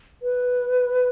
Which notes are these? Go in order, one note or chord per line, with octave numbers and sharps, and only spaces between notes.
B4